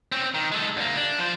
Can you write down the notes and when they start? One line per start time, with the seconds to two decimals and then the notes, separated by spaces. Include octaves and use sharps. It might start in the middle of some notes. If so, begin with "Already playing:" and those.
0.12 C4 C#4
0.35 D#3
0.52 G#3 A4
0.77 D2 A#3
0.96 D4
1.18 F3 C5